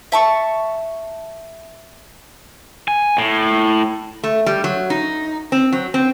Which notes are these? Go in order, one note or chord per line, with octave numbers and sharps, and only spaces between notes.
E5 A5 C#6
G#5
A2
A3
G3
F#3
D#4
C4
F#3
C4